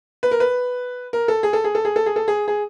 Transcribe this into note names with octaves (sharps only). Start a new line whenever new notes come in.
B4
A#4
B4
A#4
A4
G#4
A4
G#4
A4
G#4
A4
G#4
A4
G#4
G#4